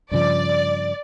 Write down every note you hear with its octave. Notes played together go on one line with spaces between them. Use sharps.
G2 C#3 F3 D5